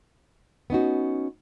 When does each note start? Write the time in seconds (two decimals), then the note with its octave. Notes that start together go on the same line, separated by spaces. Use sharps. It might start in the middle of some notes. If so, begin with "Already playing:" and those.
0.70 B3 C#4 D#4 F#4